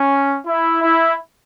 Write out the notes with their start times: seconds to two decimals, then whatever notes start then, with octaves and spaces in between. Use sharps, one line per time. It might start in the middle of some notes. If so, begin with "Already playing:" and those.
Already playing: C#4
0.46 E4
0.82 E4